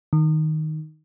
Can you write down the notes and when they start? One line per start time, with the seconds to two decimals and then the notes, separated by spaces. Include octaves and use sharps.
0.13 D#3